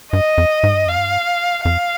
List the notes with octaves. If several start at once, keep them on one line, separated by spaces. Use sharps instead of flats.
G2 D#5
F2
G#2
G2
F2 F5
G2
F2 F5